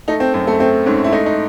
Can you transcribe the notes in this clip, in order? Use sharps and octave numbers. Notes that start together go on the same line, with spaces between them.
A3 D#4
C4
F#2 C4
A3
A3 C4
G#2 C#4
E4
A3 D#4
D#4